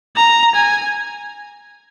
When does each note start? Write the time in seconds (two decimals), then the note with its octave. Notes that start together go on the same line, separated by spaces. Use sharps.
0.16 A#5
0.56 G#5